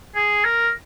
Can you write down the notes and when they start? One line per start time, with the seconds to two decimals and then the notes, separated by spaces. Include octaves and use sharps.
0.15 G#4
0.44 A#4